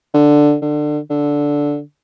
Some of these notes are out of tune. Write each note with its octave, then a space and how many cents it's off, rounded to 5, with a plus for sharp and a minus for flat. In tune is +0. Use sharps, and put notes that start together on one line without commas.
D3 +5
D3 +25
D3 -10